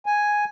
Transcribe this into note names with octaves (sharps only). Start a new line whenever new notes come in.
G#5